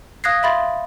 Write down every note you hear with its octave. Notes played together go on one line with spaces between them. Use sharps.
F5 D#6 F#6 G#6 A#6 C7
E5 F5 B5 C6 A6